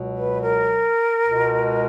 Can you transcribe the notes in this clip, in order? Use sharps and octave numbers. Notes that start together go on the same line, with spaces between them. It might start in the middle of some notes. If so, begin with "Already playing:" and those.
Already playing: C#2 B2 F#3
B4
A#4
C#2 B2 G#3